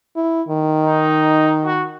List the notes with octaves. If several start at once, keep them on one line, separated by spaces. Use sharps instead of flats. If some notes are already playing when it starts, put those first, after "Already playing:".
E4
D#3
D#4
F#4